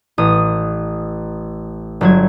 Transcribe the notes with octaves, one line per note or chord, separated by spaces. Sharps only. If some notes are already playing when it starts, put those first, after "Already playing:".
A1 D#6
G1 F#3 G#6